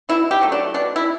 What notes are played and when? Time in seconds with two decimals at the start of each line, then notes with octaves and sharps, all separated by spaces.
0.09 B2 E4
0.31 G4
0.41 F#3 A3
0.52 D4
0.74 B2 D4
0.96 E4